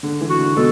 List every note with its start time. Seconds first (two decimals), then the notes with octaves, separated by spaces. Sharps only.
0.03 D3
0.21 E3
0.30 F#4
0.39 D3
0.56 B2 A4